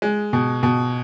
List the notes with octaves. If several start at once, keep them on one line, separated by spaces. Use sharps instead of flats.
G#3
B2
B2